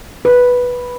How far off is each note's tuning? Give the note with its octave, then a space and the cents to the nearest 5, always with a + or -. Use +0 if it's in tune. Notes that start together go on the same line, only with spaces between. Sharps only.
B4 -5